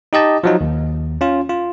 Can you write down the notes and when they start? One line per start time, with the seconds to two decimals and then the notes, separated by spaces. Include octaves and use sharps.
0.13 D#4 G4 D#5 A5
0.44 F3 F#3 D#4
0.61 D#2
1.21 C#4 F4
1.49 F4